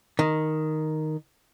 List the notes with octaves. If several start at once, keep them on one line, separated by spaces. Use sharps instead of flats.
D#3